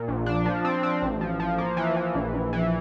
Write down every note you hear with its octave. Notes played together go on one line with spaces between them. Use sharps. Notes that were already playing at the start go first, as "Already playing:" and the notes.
Already playing: A#2
A#1
D4
F3
C4
C4
A1
F3
F3
A#3
E3
E3
A#1
A#1
E3